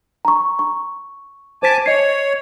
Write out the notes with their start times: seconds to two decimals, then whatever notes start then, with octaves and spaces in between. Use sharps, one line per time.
0.25 A#5 C#6
0.59 C#6
1.63 C5 G#5 A5 D6 B6
1.86 C#5 D#5 C7